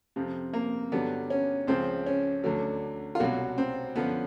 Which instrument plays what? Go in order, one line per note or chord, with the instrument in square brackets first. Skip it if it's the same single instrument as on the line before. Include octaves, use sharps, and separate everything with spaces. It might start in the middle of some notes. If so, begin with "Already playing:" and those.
[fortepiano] F2 C3 F3
A#3
G2 D3 F#3 B3
C#4
C#2 C#3 F3 C4
C#4
D2 D3 F#3
F4
C2 B2 F#3 F#4
C4
F#2 D3 F3 B3